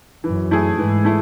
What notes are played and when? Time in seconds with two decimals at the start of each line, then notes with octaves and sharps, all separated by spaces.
0.24 F#2 E3
0.51 A3 E4 G#4
0.78 G#2 E3
1.05 A3 E4